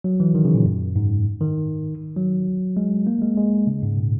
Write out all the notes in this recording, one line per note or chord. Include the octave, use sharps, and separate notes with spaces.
F#3
E3
D#3
C#3
A#2
F#2
G#2
D#3
F#3
G#3
A#3
G#3
G#3
C#3
G#2
A#2